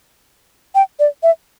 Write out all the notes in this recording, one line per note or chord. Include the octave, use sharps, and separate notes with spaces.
G5
D5
E5